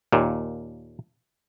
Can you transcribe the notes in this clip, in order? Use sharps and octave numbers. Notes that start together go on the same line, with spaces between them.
D#2 A#2